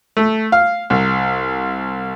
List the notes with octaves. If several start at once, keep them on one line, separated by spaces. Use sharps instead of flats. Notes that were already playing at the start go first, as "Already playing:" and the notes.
A3
F5
C2